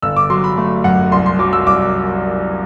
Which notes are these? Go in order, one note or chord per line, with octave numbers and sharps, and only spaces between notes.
G1 E6
D6
F#3 C6
B5
A3
F#2 F#5
C2 C6
C6
F#3 D6
E6
C2 D6